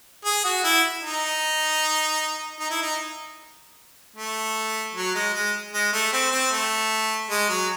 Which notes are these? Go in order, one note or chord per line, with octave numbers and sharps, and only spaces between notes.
G#4
F#4
E4
D#4
D#4
E4
D#4
A3
F#3
G#3
G#3
G#3
A3
C4
C4
A3
G#3
F#3